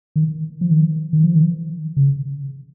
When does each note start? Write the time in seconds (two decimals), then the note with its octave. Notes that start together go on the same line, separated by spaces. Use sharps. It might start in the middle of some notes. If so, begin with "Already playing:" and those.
0.16 D#3
0.61 F3
0.71 D#3
1.13 D#3
1.24 F3
1.35 D#3
1.97 C#3